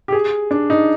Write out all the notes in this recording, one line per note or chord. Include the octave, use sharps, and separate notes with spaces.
G4
G#4
D4
D#4